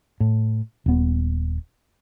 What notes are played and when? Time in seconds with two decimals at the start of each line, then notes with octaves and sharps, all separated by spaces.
0.20 A2
0.86 D#1 B3